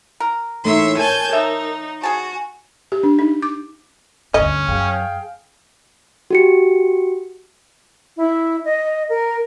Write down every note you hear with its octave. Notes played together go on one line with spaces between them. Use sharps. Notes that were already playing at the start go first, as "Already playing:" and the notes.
A#4
A2 E3 A#3 D#4 C#5 E5 C6
A#4 C#5 G#5 A5 G6
D#4 E5
F#4 G#4 G#5 A5
G4
D4
D#4
D6
D2 G2 C#4 D#5
F#2 G#4 F5 G5
F#4 G4 C#7
E4
D#5
A#4